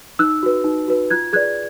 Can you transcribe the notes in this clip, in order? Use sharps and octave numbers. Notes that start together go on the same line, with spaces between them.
D#4 E6 F#6
F#4 B4
D#4
F#4 B4
F4 F#6 G#6
G#4 B4 D5 F#6 G#6